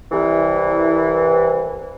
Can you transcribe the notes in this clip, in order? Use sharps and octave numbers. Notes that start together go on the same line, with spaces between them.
C2 E3